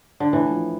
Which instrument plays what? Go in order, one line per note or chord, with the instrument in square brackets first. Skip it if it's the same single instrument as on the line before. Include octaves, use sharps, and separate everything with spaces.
[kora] D3
[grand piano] A2 [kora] E3
[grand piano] F3